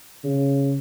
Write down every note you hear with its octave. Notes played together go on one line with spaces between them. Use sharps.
C#3